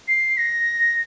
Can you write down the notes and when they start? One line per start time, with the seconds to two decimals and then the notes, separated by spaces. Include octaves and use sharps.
0.08 C7
0.37 A#6